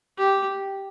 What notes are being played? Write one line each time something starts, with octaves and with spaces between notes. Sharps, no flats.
G4